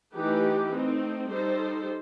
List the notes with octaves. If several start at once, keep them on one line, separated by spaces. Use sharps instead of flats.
E3 A3 D#4 G4 B4
A3 C4 D#4
G3 D#4 A4 C5